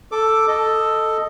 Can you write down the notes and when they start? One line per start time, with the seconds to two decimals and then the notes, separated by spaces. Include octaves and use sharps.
0.12 A4 D6
0.48 A4 D#5